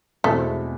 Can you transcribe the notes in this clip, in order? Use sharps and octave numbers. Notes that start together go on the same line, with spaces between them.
E2 B2 G#3 A3 C4 E4